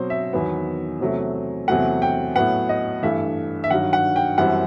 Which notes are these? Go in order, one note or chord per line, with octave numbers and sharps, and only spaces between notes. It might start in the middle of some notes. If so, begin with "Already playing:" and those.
Already playing: B2 F#3 C4 C5
E5
E2 D#3 F#3 B3
E2 C3 F#3 A3
E2 C3 F#3 A3 F#5
G5
A2 F#3 B3 F#5
D#5
G2 E3 A3 E5
E5
G2 D#3 F#3 F#5
F#5
G5
F#2 E3 G3 C4 F#5